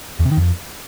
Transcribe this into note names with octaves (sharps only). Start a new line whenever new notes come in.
E2
C3
D#3
F2